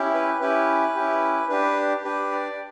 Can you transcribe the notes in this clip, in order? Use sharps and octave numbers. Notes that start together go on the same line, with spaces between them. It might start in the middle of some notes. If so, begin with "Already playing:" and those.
Already playing: C#4 E4 G4
B4
C#4 E4 G4 B4
C#4 E4 G4
D4 G4 B4
D4 G4 B4
D5